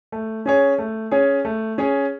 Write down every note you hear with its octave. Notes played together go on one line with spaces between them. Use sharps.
A3
C#4 G#4 C#5
A3
C#4 G#4 C#5
A3
C#4 G#4 C#5